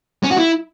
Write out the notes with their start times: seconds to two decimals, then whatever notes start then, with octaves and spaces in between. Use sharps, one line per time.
0.24 C#4
0.30 F#4
0.37 E4